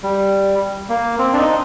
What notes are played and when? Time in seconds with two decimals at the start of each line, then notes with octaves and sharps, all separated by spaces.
0.03 G3
0.89 A#3
1.19 C4
1.33 D4
1.38 D#4